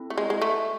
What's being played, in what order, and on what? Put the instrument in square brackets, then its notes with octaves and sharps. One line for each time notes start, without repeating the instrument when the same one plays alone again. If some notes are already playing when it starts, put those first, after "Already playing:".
Already playing: [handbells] C4 E4 A4
[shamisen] A3
G#3
G#3
A3